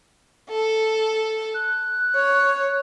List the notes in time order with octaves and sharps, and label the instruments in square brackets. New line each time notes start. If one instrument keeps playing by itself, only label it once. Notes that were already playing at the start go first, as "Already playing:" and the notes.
[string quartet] A4
[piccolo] F#6
[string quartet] C#5